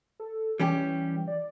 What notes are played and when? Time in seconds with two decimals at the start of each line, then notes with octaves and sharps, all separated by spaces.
0.20 A4
0.60 E3 G3 C#4 G4
1.28 D5